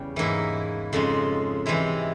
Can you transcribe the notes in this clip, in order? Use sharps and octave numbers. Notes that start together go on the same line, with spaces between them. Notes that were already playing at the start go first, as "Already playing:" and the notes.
Already playing: E2 C#3 G3 C#4
G#2 E3 A#3 E4
F2 C#3 F3 G#3
C3 E3 G#3 E4